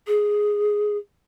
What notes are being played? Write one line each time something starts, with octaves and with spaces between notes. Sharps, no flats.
G#4